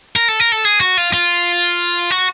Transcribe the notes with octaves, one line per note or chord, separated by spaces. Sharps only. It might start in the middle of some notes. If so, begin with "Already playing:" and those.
A#4
A4
A#4
A4
G#4
F#4
F4
F4
F#4